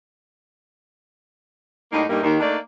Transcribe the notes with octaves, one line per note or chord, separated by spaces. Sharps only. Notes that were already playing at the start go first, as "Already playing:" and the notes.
A2 G3 A#3 D#4
G2 A#2 G3 A3 A#3 D#4
D#2 D#3
A3 A#3 D4 D#4 D5